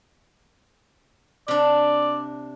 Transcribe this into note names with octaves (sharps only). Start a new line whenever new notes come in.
C3 D4 D5